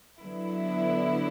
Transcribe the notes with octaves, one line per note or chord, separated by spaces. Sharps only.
D3 F#3 B3 E4